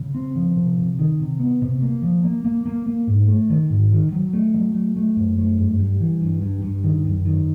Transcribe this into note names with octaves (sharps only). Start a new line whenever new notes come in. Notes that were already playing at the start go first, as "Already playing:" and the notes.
Already playing: C#3
C4
F3
C3
C3
D#3
C3
B3
C3
A#3
F3
A#3
A#3
A#3
A#3
G#2
A3
D#3
G#2
D#3
F#3
A3
F#3
A3
A3
F#2
A3
G2
G3
E3
G2
G2
G2
D#3
F#2
D#3